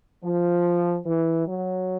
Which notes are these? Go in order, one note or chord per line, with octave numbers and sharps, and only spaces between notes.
F3
E3
F#3